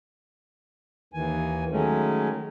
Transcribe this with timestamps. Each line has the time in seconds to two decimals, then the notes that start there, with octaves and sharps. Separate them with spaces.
1.14 D#2 D#3 E3 G#5
1.71 D#3 F#3 G#3 A3 C#4